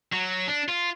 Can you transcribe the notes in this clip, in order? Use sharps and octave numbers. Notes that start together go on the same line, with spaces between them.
F#3
D4
F4